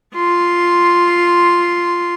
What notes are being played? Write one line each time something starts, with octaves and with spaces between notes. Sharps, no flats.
F4 C6